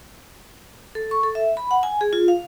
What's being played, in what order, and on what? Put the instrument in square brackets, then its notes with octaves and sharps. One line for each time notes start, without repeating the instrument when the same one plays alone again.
[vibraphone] A4
C#6
A4
E5
B5
F#5
G#5
G#4
F4
F5